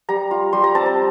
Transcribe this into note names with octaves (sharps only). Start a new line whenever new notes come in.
G3 A#5
F4
G3 C6
A#5
C4 A5
A#5